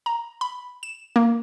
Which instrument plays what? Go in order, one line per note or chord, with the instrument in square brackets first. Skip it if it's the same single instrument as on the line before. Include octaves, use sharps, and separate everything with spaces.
[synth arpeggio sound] A#5
B5
E7
A#3